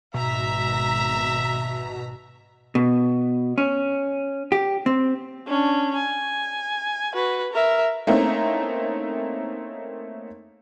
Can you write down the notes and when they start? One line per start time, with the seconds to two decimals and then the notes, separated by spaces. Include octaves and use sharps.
0.14 G#1 B2 E5 A#5 B6
2.75 B2
3.58 C#4
4.52 G4
4.86 C4
5.47 C#4 D4
5.96 G#5
7.14 F#4 B4
7.53 A#4 E5
8.07 A3 A#3 C4 C#4 D#4 E4